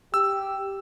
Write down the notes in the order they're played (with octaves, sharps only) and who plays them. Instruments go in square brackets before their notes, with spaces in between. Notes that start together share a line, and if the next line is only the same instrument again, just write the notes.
[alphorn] G4 [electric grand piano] E6